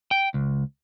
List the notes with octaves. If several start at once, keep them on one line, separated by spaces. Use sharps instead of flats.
G5
C#2